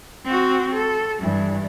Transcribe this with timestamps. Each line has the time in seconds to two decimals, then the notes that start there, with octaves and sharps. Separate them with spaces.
0.25 C4 F#4
0.74 A4
1.21 G2 E3